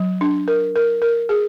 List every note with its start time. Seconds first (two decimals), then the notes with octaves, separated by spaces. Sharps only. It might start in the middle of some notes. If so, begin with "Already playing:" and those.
Already playing: F#3
0.21 D4
0.48 A#4
0.76 A#4
1.02 A#4
1.29 G#4